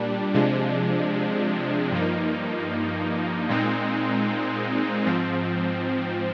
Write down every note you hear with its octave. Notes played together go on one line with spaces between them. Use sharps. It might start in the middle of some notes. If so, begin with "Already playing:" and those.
Already playing: A#2 G3 D4
C3 F3 G#3 D4
G2 F3 A#3 D#4
A#2 G#3 C4 D#4
G#2 F3 C4